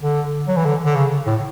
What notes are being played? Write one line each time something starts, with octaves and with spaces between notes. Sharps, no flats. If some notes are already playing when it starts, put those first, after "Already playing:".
D3
F#3
E3
D3
D3
C#3
A2